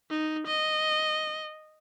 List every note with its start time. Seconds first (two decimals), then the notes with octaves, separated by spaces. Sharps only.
0.10 D#4
0.47 D#5